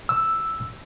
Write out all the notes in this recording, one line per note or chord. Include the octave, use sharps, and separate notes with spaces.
E6